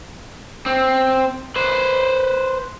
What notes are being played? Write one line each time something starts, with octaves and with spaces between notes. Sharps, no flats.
C4
B4 C5